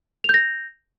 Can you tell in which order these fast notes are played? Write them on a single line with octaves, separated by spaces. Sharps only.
F7 G6 A#6